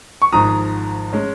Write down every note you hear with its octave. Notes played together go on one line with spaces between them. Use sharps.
C#6
G#1 G#2 F3 A#5 D#6
G#3 C#4